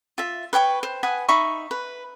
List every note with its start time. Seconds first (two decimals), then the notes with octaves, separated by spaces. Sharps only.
0.18 F4 E5
0.53 B4 C#5 G5 C#6
0.83 C5
1.03 B4 F#5 G#5 D#6
1.29 D#4 E5 B5 C#6
1.71 B4